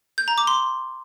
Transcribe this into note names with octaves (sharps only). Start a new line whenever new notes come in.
G6
A#5
D6
C6